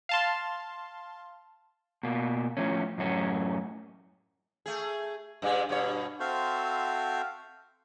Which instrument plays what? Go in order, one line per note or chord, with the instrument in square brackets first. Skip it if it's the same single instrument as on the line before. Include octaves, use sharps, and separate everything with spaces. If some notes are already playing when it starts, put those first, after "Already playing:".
[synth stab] F5 A5 C6
[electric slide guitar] B2 A#3
A2 C3 F3 C#4
F#2 A2 C#4
[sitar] A3 G#4
G2 A#2 G#3
G2 B2 C#5
[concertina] C4 F#4 A4 C5 E5 F5